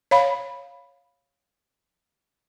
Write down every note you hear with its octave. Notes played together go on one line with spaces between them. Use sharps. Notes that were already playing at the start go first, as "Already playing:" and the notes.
C#5 F5 B5